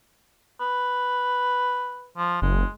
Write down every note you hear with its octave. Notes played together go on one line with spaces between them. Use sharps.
B4
F3
F#1 G#3